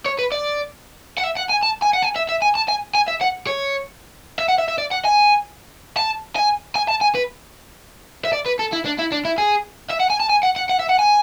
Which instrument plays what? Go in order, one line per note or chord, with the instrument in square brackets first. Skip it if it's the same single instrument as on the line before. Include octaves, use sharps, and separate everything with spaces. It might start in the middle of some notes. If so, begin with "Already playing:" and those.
[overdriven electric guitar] C#5
B4
D5
F#5
E5
F#5
G#5
A5
G#5
F#5
G#5
E5
E5
G#5
A5
G#5
G#5
E5
F#5
C#5
E5
F#5
E5
E5
D5
F#5
G#5
A5
G#5
G#5
A5
G#5
B4
E5
D5
B4
A4
E4
D4
E4
D4
E4
G#4
E5
F#5
G#5
A5
G#5
F#5
F#5
F#5
E5
F#5
G#5